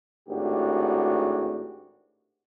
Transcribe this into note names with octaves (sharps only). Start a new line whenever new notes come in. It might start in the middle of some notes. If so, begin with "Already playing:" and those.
G#1 A2 D4 F#4 G4